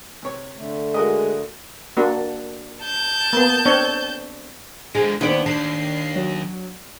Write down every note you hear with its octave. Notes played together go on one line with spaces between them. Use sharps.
C3 C#5
D3 A3
G#3 F#4 A#4 D#5
A#3 D4 F#4
A5 G6
A#3 B3
C4 D4 C#5
D3 F3 G#3
D#2 B3 D4 D5
D#2 D4 C7
F#3